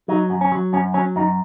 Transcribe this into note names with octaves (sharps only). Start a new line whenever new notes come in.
F#3 D#4
F#2
C#4
F#3
F#2 C#4
F#3 C#4
F#2 D#4